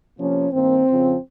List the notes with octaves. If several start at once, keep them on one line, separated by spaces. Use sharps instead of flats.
C3 F3 A#3 C#4
G2 D#3 A#3 C4
F2 C#3 F3